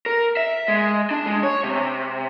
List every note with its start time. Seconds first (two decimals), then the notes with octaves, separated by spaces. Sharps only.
0.06 A#4
0.37 E5
0.68 G#3
1.11 D4
1.26 G#3
1.43 C#5
1.64 C3